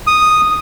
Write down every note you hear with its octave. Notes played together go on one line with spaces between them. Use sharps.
D#6